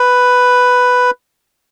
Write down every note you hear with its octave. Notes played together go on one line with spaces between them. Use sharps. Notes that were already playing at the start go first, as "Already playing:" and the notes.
Already playing: B4